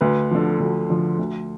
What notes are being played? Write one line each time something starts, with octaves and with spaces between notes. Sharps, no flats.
D2 B4
D3 F3
D2
D3 F3
D2